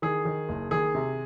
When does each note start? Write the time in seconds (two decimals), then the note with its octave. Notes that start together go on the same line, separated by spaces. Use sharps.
0.02 D#3 G#4
0.25 D#3
0.49 F#1
0.71 D#3 G#4
0.95 C3